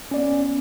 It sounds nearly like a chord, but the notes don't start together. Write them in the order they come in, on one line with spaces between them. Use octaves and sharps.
C#4 D5 B3